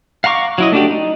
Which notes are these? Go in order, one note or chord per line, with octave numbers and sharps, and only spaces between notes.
F5 F#5 A#5 C#6 D6
F#3 E4 D#5
A3 D4 F#4 G4
D#4